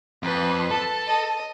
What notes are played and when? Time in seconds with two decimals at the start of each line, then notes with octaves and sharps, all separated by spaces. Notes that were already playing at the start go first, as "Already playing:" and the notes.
0.23 F2 B4
0.71 A4 A5
1.07 D#5